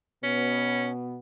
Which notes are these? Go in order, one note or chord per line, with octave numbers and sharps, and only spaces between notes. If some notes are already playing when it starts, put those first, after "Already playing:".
B2 B3 C#4